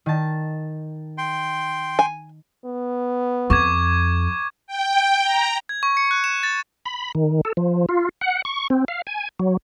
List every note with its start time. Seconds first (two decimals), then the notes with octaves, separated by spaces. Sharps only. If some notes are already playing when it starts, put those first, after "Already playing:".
0.06 D#3 A5
1.18 G5 C6
1.99 G#5
2.65 B3
3.50 F2 C#6 D6 G#6
4.67 G5
5.23 A#5
5.69 G#6
5.83 C#6
5.97 C#7
6.11 F#6
6.24 E7
6.43 A6
6.86 B5
7.15 D#3
7.45 A4
7.57 F3
7.89 F4
8.21 F#5
8.45 C#6
8.70 C4
8.88 F5
9.07 G#5
9.39 F#3